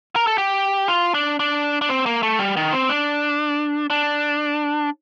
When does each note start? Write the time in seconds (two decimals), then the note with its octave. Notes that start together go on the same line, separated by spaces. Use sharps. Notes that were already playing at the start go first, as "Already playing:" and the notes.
0.16 A#4
0.27 A4
0.38 G4
0.88 F4
1.14 D4
1.40 D4
1.81 D4
1.89 C4
2.06 A#3
2.23 A3
2.39 G3
2.57 D#3
2.73 C4
2.89 D4
3.90 D4